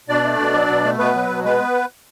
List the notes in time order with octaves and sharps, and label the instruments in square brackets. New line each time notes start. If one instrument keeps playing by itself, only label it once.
[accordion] B2 D4 D5
A3
B2
F#3
B2
A3
B2 B3 B4
F#3
B2
G#3 B3 B4